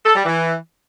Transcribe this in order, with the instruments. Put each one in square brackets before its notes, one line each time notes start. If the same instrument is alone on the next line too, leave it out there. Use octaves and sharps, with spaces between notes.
[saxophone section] A4
G3
E3